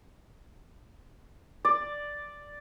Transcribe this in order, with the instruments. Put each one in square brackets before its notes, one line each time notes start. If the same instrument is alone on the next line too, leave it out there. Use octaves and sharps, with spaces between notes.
[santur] D5